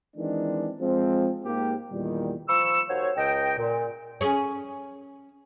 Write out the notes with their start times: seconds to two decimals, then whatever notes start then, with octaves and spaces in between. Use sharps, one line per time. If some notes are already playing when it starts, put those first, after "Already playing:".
0.16 D#3 E3 G#3 C4 D4
0.80 F3 G#3 C4
1.44 G#2 A#3 G4
1.91 E2 A#2 D#3 G3
2.49 F3 B5 C#6 E6
2.89 D#2 F#4 C5 C#5
3.17 C#2 D#5 G5
3.58 A#2
4.21 C#4 G#4